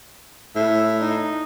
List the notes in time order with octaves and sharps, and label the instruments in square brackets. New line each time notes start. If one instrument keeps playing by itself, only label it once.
[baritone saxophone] A2 [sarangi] E5
[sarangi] D#4